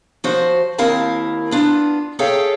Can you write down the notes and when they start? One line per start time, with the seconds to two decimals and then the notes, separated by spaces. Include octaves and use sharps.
0.24 F3 F#4 C5
0.78 D#2 C4 E4 A#4 F5 A5
1.51 B3 D4 F4
2.19 G#4 A4 C#5 E5 F5 G5